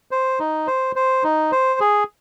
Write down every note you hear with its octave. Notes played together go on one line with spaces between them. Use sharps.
C5
D#4
C5
C5
D#4
C5
G#4